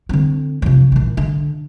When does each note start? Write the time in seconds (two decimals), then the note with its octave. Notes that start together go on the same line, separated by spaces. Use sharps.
0.09 D3 C4
0.62 C3 F3
0.92 A#1 E3
1.17 D3